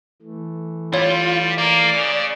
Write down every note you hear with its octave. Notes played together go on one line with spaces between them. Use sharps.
E3 A3
G3 F4 C#5
A#3 D5
C#3